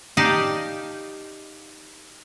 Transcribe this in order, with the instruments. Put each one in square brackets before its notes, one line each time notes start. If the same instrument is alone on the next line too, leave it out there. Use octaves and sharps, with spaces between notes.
[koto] D#4 G4 D5 F5 A5